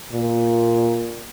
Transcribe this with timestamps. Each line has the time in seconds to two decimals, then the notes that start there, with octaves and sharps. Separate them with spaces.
0.12 A#2